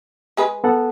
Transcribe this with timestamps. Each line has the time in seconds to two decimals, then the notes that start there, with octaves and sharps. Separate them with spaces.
0.37 G#3 G#4 B4
0.64 B3 A4 F#5